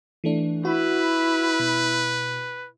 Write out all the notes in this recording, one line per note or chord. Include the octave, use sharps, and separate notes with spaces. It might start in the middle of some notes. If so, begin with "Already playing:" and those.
E3 A3 D4
E4 F#4 B4
B2